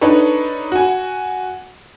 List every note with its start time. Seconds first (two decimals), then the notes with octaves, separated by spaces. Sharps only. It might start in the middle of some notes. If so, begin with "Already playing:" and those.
0.01 D4 D#4 A4 B4 C#5
0.72 F#4 G#5